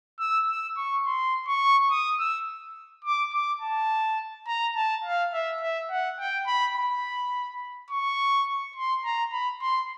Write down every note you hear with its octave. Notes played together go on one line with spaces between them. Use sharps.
E6
E6
C#6
C6
C#6
D#6
E6
D6
D6
A5
A#5
A5
F5
E5
E5
F#5
G5
B5
B5
C#6
C6
A#5
B5
C6